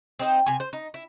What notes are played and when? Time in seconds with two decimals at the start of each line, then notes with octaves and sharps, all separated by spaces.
0.19 C4 D#4 C5
0.46 C3 G#5
0.60 C5
0.73 D#4
0.94 E4